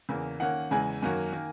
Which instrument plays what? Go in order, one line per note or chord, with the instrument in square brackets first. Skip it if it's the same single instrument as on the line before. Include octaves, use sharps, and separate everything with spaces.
[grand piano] E2 C#3 E3 A#3
[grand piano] D#3 A#3 C#4 [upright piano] F#5
[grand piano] E2 C#3 E3 G#3 [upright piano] G#5
[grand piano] F#2 D#3 A#3 C#4 F#4
D#3 A#3